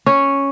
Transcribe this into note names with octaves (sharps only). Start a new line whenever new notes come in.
C#4